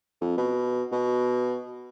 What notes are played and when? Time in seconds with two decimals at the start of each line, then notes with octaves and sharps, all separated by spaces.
0.21 F2
0.37 B2
0.92 B2